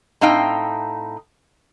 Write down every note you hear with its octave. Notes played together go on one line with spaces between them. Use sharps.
A2 C4 D#4 F5 G5